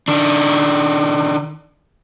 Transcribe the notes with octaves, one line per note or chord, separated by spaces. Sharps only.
D#3 D4